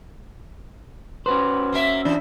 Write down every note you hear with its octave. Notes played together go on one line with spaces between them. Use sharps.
C#4 F#4 B4 C5
A#3 A#4 E5
E3 D4